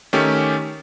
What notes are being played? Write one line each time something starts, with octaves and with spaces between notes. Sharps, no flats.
D#3 A3 C#4 G4